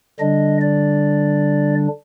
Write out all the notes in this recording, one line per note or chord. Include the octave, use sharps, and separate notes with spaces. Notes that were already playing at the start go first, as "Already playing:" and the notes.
D3 G3 D4 D#5
D5